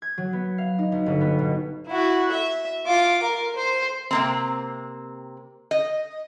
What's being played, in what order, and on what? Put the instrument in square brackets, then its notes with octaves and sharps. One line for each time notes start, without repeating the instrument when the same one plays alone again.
[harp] G#6
F#3
B3
F5
D#4
B1
G1
B3
B2
[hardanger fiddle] E4 F#4
E5
F4 D6
A#4
C5
[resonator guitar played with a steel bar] C3 A#3 C4
D#5